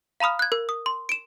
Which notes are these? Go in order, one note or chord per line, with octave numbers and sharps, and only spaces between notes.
F5 A#5 B5 D#6 F6
F#6 G#6
A#4
D#6
C6
D7 E7